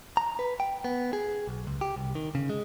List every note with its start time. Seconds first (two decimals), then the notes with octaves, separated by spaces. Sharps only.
0.17 A#5
0.39 B4
0.60 G5
0.84 B3
1.13 G#4
1.47 B1
1.67 C#2
1.81 G4
1.96 C2
2.15 D#3
2.35 C#3
2.49 G#3